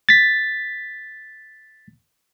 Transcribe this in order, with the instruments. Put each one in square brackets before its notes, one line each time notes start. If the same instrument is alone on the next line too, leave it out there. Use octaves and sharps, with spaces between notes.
[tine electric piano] A6 B6